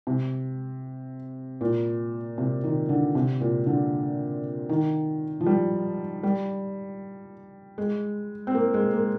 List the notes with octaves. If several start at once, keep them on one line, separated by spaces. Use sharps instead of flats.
C3
A#2
C3
D#3
D3
C3
A#2
D3
D#3
F3
G3
G3
G#3
C4
A#3
G#3
A#3